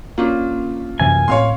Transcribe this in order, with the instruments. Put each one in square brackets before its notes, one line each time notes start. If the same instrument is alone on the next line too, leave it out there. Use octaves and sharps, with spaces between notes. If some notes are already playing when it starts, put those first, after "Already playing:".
[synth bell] A#3 C#4 D4 [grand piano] F4
[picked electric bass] F#2 C3 E3 [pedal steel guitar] G#5
[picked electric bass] A2 C4 [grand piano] C#5 F5 C6